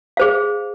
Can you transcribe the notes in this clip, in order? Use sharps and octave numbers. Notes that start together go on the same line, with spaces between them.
G#4 C5 F5